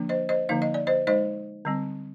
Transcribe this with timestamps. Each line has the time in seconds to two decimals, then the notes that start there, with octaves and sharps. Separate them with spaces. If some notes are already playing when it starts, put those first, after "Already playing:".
Already playing: D3 F3 A#3 D4
0.09 C5 D#5
0.29 C5 D#5
0.49 D3 F3 A#3 D#4 F5
0.62 D#5
0.74 D5
0.87 C5 D#5
1.07 G#3 D#4 C5 D#5
1.65 D3 G3 C4